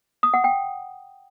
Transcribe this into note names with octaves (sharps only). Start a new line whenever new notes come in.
D#6
F#5
G5